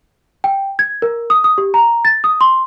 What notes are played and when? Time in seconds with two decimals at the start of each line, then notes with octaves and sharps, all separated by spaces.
0.44 G5
0.79 G#6
1.02 A#4
1.30 D#6
1.44 D#6
1.58 G4
1.74 A#5
2.05 A6
2.24 D#6
2.41 C6